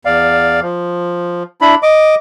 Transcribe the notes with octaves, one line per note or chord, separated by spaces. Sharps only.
E2 D5 F5
F3
D4 E4 B5
D#5 D6